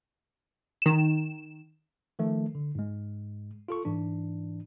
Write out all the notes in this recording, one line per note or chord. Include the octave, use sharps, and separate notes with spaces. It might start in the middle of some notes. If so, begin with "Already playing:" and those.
D#3 E7
D#3 F3 A3
D3
G#2 G#3
F4 A4 C#6
G#2 E3 D4